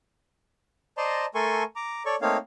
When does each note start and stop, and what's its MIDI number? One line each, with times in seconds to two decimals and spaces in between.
0.97 1.26 72
0.97 1.26 74
0.97 1.26 75
0.97 1.26 81
0.97 1.26 82
0.97 1.26 84
1.35 1.63 57
1.35 1.63 69
1.35 1.63 70
1.35 1.63 80
1.35 1.63 84
1.35 1.63 85
1.76 2.03 82
1.76 2.03 86
2.06 2.16 69
2.06 2.16 73
2.06 2.16 74
2.06 2.16 85
2.22 2.37 57
2.22 2.37 58
2.22 2.37 60
2.22 2.37 63
2.22 2.37 73
2.22 2.37 77